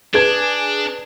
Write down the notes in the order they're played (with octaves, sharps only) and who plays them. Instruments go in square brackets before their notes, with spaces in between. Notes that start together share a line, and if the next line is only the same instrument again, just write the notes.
[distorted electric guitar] D4 [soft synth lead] G#4 [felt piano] B4 G#6